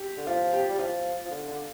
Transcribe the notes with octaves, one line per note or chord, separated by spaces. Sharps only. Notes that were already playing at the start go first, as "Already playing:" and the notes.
Already playing: G4
D3
F3 F4
G4
G3
F3 F4
F3
D3
D3